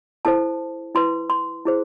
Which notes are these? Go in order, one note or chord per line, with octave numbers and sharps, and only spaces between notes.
E4 A4 C5 A5
E4 B4 C6
C6
E4 G#4 C5